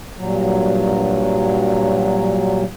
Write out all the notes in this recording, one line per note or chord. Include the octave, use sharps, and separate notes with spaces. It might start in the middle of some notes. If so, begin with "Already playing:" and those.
G2 A#2 F#3